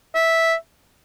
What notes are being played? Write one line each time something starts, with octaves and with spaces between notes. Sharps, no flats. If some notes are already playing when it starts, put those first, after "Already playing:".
E5